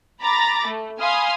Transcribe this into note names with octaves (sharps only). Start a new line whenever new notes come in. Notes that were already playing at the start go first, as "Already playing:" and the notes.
A#5 B5 D6 A6 A#6
A3
F5 G#5 B5 C6 D#6 F6